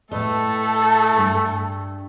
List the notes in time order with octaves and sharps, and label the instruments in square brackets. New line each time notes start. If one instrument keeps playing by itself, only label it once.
[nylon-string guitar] A2 B4 D#5 [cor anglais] A3 [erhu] A4
[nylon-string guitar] G2